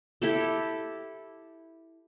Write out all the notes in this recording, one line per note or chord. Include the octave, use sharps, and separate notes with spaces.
E4 G4 A4